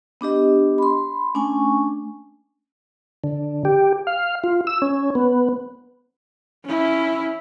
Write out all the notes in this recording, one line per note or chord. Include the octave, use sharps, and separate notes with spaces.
B3 D4 G4 D#5
B5 C6
A3 C#4 D4 G#5 C#6
D3
G4
F5
F4
E6
C#4
B3
C#4 E4